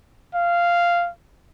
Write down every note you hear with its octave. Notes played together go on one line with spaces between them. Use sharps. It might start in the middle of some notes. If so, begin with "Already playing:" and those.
F5